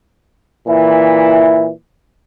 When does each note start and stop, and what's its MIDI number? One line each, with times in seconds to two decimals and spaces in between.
0.68 1.70 46
0.68 1.70 52
0.68 1.70 64